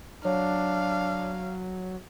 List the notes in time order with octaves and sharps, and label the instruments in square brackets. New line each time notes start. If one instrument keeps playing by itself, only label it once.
[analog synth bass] F#3 [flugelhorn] D4 [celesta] C#5 [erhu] F5